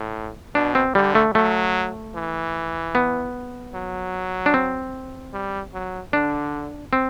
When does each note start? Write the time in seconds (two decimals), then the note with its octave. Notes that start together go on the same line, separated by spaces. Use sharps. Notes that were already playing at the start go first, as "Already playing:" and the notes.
Already playing: A2
0.55 B2 D4
0.75 C4
0.95 D3 G3
1.15 A3
1.35 F#3 A3
2.15 E3
2.95 B3
3.74 F#3
4.46 D4
4.54 C4
5.34 G3
5.74 F#3
6.13 D3 D4
6.93 C4